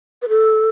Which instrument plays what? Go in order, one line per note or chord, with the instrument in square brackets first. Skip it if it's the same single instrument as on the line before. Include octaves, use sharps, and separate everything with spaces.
[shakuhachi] B4
A4